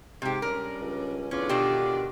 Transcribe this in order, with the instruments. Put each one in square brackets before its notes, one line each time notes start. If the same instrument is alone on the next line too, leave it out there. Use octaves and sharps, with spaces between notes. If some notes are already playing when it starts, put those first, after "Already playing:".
[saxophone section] G#2 [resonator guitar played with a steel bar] C3 G4
[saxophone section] G3 C#4 D4 [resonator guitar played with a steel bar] A#4
[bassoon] C#2
[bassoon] E2 [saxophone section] D3 F4 D5 [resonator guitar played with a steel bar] C#4
[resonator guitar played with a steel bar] B2 D#3 D4 [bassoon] G4